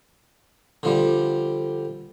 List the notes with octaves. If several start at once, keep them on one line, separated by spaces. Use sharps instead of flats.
D3 F3 G3